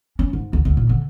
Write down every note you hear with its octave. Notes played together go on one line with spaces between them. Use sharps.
C#4
G#2
D2
D2
A#2
D3